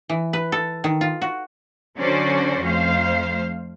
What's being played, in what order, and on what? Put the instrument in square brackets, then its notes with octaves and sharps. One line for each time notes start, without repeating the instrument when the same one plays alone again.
[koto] E3
B4
A4
D#3
F4
F#4
[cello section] D3 F#3 C#4 F#4 C5 D5
F2 A3 C5 F5